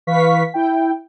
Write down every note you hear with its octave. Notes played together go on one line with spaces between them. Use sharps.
E3 B4 F5 C#6 B6
E4 G5